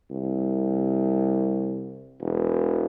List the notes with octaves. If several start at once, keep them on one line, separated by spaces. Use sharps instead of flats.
C2
E1